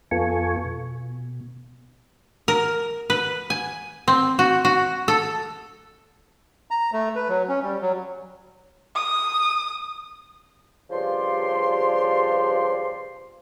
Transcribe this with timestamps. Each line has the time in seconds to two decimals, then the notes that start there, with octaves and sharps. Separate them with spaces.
0.11 F2 B3 F4 A4 G#5 C#6
0.65 B2
2.48 A#4
3.10 B4
3.50 G#5
4.08 C4
4.39 F#4
4.65 F#4
5.08 A4
6.71 A#5
6.93 A3
7.15 B4
7.29 F#3
7.49 C#4
7.63 G3
7.81 F#3
8.96 D#6
10.90 G2 C#3 F3 G4 D5 C6